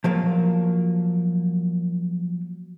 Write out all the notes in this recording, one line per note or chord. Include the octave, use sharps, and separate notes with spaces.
F3 F#3 A#3